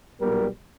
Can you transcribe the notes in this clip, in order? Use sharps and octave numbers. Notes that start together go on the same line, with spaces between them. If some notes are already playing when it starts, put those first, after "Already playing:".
B1 A#2 G3 B3 A#4